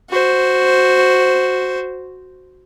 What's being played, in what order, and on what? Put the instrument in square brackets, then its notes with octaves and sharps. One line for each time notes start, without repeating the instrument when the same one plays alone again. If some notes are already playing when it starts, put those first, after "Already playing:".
[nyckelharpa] F#4 C5